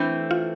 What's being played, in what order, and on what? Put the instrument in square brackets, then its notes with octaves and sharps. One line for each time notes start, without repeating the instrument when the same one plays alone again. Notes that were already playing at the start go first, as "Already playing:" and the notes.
Already playing: [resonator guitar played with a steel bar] E3 A3 C4 [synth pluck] D4
[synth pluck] F4